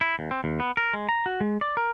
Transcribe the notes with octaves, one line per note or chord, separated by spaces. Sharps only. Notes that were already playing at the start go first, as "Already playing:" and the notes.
E4
D#2
C4
D#2
B3
A#4
G#3
A#5
F#4
G#3
D5
A#4